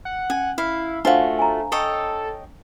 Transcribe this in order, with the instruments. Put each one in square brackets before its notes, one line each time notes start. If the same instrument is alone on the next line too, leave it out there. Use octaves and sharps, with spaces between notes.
[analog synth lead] F#5
[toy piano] C#4 [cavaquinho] G#5
[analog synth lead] E4 [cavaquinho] F5
[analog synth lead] A3 [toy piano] D4 C5 F5 [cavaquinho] F4 F#4
[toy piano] G#5 A#5
[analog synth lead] A4 [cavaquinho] C#5 D#5 G5